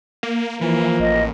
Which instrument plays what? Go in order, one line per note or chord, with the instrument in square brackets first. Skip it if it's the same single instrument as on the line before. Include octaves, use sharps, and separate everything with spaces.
[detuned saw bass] A#3
[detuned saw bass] E3 [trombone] F3 [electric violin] A#3
[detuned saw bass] A1 [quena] D#5